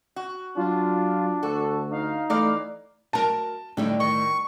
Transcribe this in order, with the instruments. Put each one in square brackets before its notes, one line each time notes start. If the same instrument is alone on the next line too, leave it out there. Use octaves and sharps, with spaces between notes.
[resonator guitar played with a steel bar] F#4
[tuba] F#3 [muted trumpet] D4 [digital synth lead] F4
[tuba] D2 [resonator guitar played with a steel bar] F#4 [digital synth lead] A4
[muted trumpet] D#4 [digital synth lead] F5
[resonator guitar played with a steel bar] E3 D5 A#5 [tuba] A3 [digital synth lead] F5
[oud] F#4 A#4 [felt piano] A5
[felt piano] A2 [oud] D3 G3 D#4
[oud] D#3 [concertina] C#6